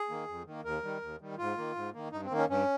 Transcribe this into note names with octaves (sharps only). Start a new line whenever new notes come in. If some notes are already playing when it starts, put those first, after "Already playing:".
Already playing: G#4
D#3 A#3
F2
D#3 A#3
D#2 A#4
D#3 G3
D#2
D#3 G3
G#2 F4
D#3 A#3
G#2
D#3 A#3
G2 D#4
C4
D#3 A#3
C#4
G2 C#4